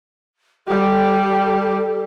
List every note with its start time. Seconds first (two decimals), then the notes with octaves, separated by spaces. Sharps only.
0.67 G3 G4 A4